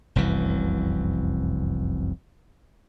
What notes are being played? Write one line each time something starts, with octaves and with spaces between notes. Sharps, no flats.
F1 C2 F#2 E3